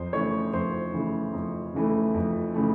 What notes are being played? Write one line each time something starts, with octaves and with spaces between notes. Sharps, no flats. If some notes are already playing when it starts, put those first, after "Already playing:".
Already playing: F2 C5
C#3 E3 A3 C#5 C#6
F2 C5 C6
C#3 E3 A3
F2
C#3 E3 A3
F2
C#3 E3 A3